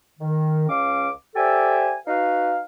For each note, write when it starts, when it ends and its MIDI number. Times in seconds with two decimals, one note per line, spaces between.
0.20 0.66 51
0.68 1.09 37
0.68 1.09 61
0.68 1.09 77
0.68 1.09 86
1.36 1.94 67
1.36 1.94 69
1.36 1.94 72
1.36 1.94 74
1.36 1.94 76
1.36 1.94 80
2.07 2.58 63
2.07 2.58 66
2.07 2.58 71
2.07 2.58 77